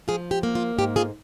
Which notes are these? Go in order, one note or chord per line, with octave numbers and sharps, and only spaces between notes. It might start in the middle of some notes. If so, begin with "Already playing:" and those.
F3 F4 G#4
G4
A#3
F4
G#2 G4
F4 G#4